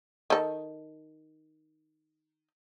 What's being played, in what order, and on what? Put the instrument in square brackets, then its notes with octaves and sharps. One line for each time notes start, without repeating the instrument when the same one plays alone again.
[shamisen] D#3 A4